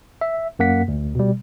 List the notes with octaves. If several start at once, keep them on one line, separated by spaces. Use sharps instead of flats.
E5
F#2 A#3 F#5 B6
D2
B2 G3